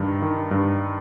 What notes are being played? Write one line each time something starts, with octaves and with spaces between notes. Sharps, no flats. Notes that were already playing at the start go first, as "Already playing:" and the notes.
Already playing: G2 D#3
D#3
G2